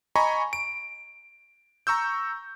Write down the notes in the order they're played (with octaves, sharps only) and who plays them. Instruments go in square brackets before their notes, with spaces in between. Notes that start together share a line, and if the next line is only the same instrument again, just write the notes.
[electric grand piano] D#5 G#5 A#5 B5 C#6
D7
A#5 C#6 E6 G6